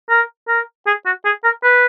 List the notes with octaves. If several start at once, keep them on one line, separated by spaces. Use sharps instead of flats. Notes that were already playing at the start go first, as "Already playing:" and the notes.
A#4
A#4
G#4
F#4
G#4
A#4
B4